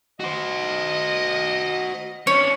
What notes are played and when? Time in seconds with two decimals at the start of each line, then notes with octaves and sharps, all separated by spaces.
0.20 F#4 C5 D#5
2.27 C#4 D4 C#5